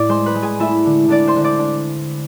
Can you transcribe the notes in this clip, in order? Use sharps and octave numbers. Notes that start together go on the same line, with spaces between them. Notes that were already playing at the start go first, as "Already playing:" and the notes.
Already playing: A2 D5 D6
G#3 C5 C6
B4 B5
G#3
G#4 G#5
A3 E4 E5
D3
D3 D4 D5
C5 C6
D3
D5 D6
D4